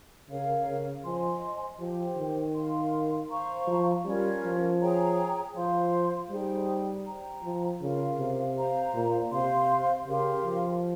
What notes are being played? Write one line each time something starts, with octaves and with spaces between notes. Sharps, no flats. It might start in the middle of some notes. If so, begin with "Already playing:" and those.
C#3 A#4 C#5 F5
C#3
F3 C5 D#5 G#5 C6
F3 G4 C5 G5
D#3
A#4 F5 C6
C5 F5 A#5 C#6
F3
G3 C#4 F4 A#4
F3
G#4 C#5 G5 A#5
F3 C5 F5 C6
G3 D#4 G#4 C5 G5
C5 G5 A#5
F3
C#3 F4 A#4 F5
C3
C5 F5 A#5
A#2
C3 C5 F5 C6
C#3 G4 A#4 F5 C6
F3